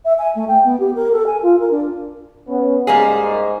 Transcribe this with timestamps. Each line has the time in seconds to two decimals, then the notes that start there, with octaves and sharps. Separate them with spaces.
0.05 E5
0.18 G#5
0.35 A3
0.48 G5
0.64 B3
0.80 G4
0.95 A#4
1.12 A4
1.26 G#5
1.43 F4
1.59 A#4
1.71 D4
2.48 B3 C#4
2.87 G#2 G3 A#3 G#4